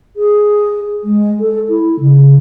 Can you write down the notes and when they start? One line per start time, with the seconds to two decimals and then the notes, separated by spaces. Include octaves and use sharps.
0.16 G#4
1.03 G#3
1.40 A4
1.69 E4
2.00 C#3